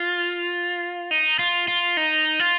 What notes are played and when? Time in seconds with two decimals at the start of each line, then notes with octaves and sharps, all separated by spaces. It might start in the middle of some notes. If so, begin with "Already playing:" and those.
Already playing: F4
1.11 D#4
1.39 F4
1.68 F4
1.97 D#4
2.39 F4